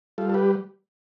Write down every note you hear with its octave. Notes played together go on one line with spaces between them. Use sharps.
G3 F4 A4
A4
G4 B4